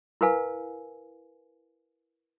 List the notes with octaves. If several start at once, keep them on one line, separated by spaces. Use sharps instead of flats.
E4 A#4 B4 F5 G#5